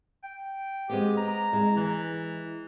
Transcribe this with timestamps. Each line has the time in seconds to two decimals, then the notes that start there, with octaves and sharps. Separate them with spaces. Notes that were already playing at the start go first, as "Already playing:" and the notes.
0.23 G5
0.90 G#3 B3 C4 G4
1.17 A#5
1.53 G#3 E4
1.77 E3